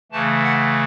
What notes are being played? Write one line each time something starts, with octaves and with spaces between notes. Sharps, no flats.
C#3 E3 A3 A5
F#5